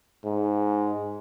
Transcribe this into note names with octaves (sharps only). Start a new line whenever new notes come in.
G#2